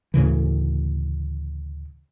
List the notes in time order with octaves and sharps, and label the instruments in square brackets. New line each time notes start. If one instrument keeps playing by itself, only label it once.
[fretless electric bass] D2 A2 C#3 E3